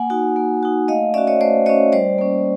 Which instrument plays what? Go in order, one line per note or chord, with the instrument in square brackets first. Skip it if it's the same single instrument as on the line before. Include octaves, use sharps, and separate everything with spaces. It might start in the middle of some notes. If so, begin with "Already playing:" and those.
Already playing: [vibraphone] A#3 F#5 G#5
D#4 F#4
A#3
D#4 F#4
A3 D#5 F5
C#4 F#4 D5 E5
C#5 D#5
A3 C5 D5
C#4 F#4 C#5 D#5
G3 C5 D5
A#3 C#4